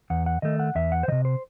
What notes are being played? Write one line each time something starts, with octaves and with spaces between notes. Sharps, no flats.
E2 F#5
F#5
D#3 A3 D#5
F#5
E2 E5
F#5
C5
C3 D#3 D#5
C5